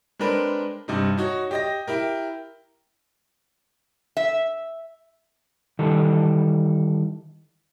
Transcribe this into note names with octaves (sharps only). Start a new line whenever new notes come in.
G#3 C4 D4 A#4 B4
G2 C3 D#4
D#4 F#4 C#5
G4 D#5 A#6
E4 G4 A#4
E5
D#3 E3 G3 A4